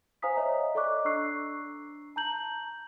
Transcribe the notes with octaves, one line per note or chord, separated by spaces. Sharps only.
C5 F5 G#5 A#5 D#6 B6
C5 C#5 D#5 E5 A#5
A4 D5 D#5 C#6 D6 F#6
D4 A#5 C#6 E6 F#6 C7
A5 A#5 G6 F#7